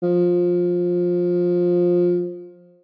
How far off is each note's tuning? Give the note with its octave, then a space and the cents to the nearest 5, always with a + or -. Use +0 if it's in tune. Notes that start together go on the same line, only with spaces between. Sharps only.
F3 +15